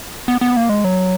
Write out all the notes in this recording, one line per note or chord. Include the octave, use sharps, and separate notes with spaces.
B3
B3
A#3
G#3
F#3